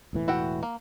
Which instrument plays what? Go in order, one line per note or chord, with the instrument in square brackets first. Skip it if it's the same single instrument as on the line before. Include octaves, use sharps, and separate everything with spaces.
[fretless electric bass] E1 A2 E3
[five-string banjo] E4 F#4 G5
A#3